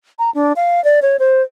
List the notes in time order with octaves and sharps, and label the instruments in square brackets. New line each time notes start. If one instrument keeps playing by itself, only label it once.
[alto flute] A#5
D4
F5
D5
C#5
C5